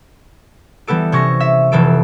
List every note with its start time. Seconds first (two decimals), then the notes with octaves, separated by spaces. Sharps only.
0.87 E3 G3 B3 A4 D7
1.12 C3 C#4 C#6 A#6
1.40 E5
1.72 F1 E3 A4 D7